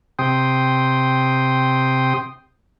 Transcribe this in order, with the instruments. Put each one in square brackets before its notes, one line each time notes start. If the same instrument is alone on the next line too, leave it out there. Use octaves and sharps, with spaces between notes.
[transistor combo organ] C3 G5 C6 D#6